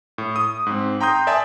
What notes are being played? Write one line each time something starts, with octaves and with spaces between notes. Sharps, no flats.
A2
D#6
G#2 C4
G5 A#5 C6 D#6 G6
D5 E5 G#5 A5 D#6